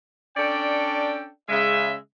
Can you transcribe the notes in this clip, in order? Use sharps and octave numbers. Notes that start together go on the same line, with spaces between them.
C#4 D4 A4 D5 G5
C#3 G#3 E5